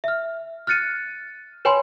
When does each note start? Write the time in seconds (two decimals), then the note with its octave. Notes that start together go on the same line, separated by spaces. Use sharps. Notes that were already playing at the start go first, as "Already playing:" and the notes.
0.04 E5 F6
0.67 F6 F#6 A6 C#7 D#7
1.65 B4 C#5 G5 G#5 B5 C6